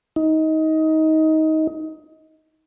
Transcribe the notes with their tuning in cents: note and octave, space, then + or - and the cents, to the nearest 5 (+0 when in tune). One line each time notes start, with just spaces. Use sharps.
D#4 +20